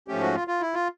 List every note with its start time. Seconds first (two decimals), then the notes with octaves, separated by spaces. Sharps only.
0.08 G#2 F3 A3 C#4 G4
0.21 F#4
0.35 F4
0.48 F4
0.61 E4
0.74 F4